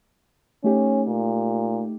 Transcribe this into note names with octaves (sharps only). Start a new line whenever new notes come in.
A3 C#4 D#4 G4
A#2